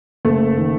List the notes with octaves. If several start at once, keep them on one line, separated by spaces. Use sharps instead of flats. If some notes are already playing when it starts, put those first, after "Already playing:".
F#1 A3
D#3